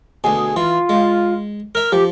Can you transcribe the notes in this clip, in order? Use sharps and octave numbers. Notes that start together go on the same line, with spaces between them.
D2 B2 G#4
E3 F4
G#3
A#4 E5 F6
F3 G4